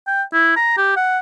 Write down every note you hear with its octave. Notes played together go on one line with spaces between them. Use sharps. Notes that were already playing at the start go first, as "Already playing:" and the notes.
G5
E4
A#5
G4
F#5